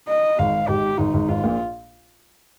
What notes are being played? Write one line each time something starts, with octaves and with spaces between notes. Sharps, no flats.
D#5
G#1 G#2 F5
G#1 G#2 G4
G#1 G#2 D#4
G#1 G#2
G#1 G#2 F4
A#1 A#2